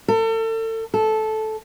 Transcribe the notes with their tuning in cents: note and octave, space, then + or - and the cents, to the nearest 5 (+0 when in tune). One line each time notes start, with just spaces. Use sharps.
A4 +35
A4 -10